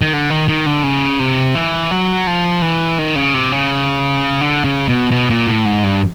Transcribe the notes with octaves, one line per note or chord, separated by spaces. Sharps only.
D#3
D3
D#3
D#3
D3
C#3
C3
E3
F#3
F3
E3
D#3
C#3
C3
C#3
D3
C#3
B2
B2
A#2
A2
G#2
G2